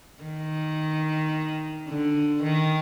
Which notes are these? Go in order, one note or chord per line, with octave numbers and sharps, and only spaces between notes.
D#3
D3
D#3